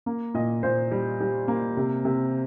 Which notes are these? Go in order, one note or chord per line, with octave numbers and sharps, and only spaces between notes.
A#3
A#2 D#5
A#2 C5
G3
G3
A#3
C3
C3